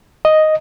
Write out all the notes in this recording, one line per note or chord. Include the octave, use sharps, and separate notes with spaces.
D#5